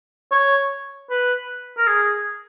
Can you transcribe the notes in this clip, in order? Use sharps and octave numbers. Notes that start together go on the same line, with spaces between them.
C#5
B4
A#4
G#4